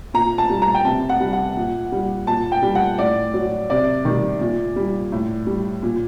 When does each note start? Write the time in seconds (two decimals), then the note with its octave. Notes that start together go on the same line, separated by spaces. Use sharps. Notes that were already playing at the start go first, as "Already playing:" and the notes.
0.14 A#2 A#5
0.38 A5
0.50 G3
0.62 A#5
0.74 G5
0.85 C3 A5
1.09 F#5
1.20 G3
1.33 F#5
1.57 A#2
1.92 G3
2.27 A#2 A5
2.52 G5
2.62 G3
2.75 F#5
2.99 A2 D5
3.34 F#3
3.70 C3 D5
4.05 D#3 G3
4.41 A#2
4.76 G3
5.12 A2
5.47 G3
5.83 A#2